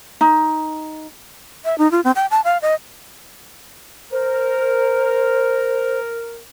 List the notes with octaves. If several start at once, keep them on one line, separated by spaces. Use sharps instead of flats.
D#4
E5
D#4
F4
C4
G5
A5
F5
D#5
A#4 C5